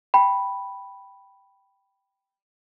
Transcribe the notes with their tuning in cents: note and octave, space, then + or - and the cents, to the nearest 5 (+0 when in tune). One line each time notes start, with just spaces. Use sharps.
G5 +0 B5 +0